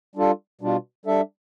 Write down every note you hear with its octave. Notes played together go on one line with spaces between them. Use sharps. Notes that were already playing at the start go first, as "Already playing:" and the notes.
G3 D4 F4 A4
B2 G3 D4 F4
G3 D4 A4 E5